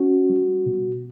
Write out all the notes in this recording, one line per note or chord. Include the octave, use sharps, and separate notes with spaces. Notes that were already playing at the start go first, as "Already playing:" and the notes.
Already playing: C#4 F#4
G3
B2